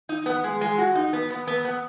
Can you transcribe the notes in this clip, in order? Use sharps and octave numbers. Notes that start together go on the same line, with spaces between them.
D#4
B3
G#3
G#3
F#4
D#4
B3
B3
B3
B3